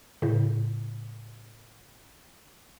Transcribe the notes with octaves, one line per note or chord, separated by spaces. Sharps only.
A2 C#3